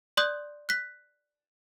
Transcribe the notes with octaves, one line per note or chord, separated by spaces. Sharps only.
D5 C6 D#6 F#6 G6
F#6 B6